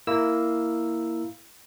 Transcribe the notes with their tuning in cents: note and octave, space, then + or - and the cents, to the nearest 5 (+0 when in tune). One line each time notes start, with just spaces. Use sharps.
A#3 -5 E4 +0 E6 +0